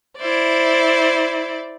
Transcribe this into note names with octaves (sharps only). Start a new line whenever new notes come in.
E4 C5 D5